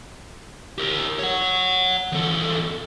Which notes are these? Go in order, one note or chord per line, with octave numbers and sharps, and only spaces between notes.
G4 A#4
C#5 F#5
E2 A4